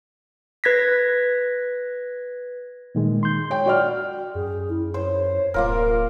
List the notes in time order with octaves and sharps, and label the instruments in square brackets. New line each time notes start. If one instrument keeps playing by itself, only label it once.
[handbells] B4 G#6 A#6 B6
[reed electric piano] A#2 D#3 G#3
C6 G6
[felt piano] C#5 G5
F#4 D5 F6
[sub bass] F#2 [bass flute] G#4
[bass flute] E4
[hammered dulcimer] C5 [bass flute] C#5
[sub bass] D1 [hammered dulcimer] A#3 F4 A#4